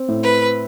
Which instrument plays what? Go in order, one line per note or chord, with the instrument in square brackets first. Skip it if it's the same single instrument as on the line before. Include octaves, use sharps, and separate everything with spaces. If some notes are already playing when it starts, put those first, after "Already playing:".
Already playing: [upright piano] C4
A2
[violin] B4